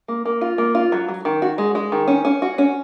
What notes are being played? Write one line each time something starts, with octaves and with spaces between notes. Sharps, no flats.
A#3
A#3
F4
A#3
F4
F#3
F#3
D#3
F#4
G#3
G#3
D#3
C#4
C#4
F#4
C#4